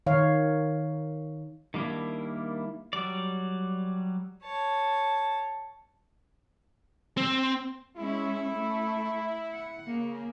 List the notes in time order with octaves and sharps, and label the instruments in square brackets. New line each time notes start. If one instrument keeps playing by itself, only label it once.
[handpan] D#3 C#5 F5
[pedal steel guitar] D#3 G3 A#3 D4 E4
F#3 G3 D5
[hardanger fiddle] C#5 A5
[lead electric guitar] C4
[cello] G#3 C#4 [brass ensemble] E4
[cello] A3
F#5
[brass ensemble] C#3 [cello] A#3